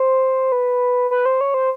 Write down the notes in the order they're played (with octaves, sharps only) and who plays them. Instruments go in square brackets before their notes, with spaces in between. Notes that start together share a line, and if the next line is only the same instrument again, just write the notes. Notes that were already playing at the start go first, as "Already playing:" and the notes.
Already playing: [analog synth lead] C5
B4
B4
C5
C#5
C5